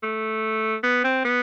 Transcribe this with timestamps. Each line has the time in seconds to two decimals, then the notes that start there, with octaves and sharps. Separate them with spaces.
0.03 A3
0.83 B3
1.04 C4
1.25 B3